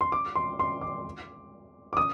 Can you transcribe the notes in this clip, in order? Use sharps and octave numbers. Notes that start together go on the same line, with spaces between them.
C6
D6
C6
C6
D6
D6
D#6